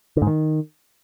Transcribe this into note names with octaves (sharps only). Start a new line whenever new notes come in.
D3
G#2
D#3